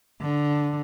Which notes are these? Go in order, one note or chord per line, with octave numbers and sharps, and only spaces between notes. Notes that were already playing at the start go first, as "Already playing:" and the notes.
D3